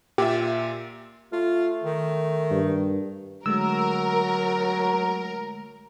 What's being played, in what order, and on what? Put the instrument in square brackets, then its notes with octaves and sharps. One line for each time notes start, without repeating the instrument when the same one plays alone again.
[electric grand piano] A#2 F4 E5 [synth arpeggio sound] G4
[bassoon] A3 [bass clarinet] F4
[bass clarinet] D#3
[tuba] G2
[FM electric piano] D3 G#3 A3 [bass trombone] F#3 [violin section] A#4 [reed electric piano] E6